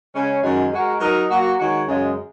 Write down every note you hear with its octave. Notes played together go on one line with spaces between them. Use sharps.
C#3 G#3 C#4
F#2 D#3 G#3 C#4 F#4
G#3 F#4 A#4
F#3 D#4 A#4 D#5
F#3 A#3 F#4
D#3 G#3 F#4 C#5
F#2 C#3 G#3